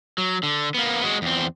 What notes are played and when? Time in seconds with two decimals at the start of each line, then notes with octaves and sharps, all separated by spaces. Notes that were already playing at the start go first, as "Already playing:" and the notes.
0.18 F#3
0.43 D3
0.74 A#3 B3
1.04 G#3 F#4
1.22 E2 C4